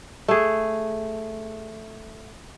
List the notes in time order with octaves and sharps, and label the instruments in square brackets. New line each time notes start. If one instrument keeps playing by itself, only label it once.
[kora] A3 G#4